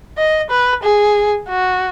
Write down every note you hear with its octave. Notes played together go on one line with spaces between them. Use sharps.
D#5
B4
G#4
F#4